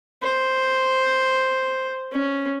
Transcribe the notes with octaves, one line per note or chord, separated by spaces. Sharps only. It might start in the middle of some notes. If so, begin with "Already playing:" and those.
C5
C#4